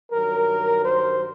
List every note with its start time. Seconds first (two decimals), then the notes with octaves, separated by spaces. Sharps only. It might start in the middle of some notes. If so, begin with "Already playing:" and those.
0.12 G2 D#3 F#3 A#4
0.85 C5